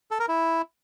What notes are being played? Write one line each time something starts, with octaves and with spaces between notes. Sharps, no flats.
A4
A#4
E4